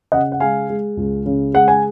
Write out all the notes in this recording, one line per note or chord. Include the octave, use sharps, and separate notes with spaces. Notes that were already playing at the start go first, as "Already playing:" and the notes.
C#3 D#5 F#5
F#5
G#3 F5 G#5
G#3
C#2
C#3
G#3 F#5
G#5